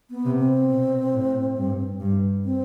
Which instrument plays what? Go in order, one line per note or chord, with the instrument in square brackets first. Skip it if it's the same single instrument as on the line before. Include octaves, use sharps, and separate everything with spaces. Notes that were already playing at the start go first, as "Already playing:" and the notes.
[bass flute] B3
[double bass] C3
[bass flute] C4
[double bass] B2
A2
G2
G2
[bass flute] C4